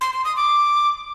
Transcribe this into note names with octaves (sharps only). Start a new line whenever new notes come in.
C6
C6
D#6
D6